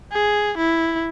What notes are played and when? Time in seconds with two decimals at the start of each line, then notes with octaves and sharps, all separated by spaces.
0.12 G#4
0.58 E4